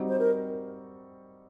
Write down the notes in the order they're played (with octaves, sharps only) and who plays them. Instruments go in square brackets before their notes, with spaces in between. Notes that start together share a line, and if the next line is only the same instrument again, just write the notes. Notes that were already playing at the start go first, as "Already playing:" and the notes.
Already playing: [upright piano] G3 C4 D#4 F#4
[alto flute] C5
A#4